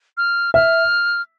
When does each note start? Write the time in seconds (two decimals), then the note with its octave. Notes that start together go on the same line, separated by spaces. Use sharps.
0.17 F6
0.54 E5 F6